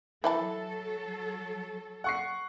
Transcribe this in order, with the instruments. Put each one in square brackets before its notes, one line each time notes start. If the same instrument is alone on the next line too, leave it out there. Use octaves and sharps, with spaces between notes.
[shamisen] E3 E4 A5 [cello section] F#3 A4
[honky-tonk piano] F#5 C#6 C7